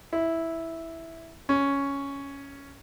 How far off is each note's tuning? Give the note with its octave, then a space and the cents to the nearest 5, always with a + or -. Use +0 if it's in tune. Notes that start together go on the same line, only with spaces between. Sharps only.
E4 -5
C#4 +5